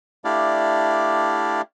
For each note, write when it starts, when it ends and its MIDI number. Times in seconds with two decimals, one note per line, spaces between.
0.25 1.62 57
0.25 1.62 62
0.25 1.62 64
0.25 1.62 67
0.25 1.62 74
0.25 1.62 77